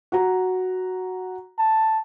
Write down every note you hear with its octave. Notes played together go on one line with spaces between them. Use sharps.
F#4 A#5
A5